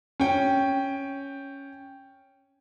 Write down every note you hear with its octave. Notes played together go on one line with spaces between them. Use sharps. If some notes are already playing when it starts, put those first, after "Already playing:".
C#4 G5